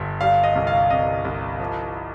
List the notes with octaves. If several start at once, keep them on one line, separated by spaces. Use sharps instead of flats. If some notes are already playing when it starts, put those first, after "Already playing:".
Already playing: G1 G2
G3 F5
D#5
C2
F5
C3 D#5
C2
F3